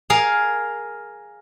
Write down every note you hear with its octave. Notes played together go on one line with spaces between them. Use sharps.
G#4 A#4 F5